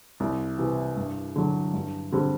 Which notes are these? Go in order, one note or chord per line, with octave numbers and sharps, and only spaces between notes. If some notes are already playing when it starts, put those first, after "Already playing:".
C2
C3 E3
G2
D3 F#3
G2
D3 G3 C4